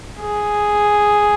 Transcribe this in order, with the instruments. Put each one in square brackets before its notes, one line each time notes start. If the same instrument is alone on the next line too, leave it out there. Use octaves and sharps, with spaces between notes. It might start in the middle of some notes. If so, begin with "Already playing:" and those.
[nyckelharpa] G#4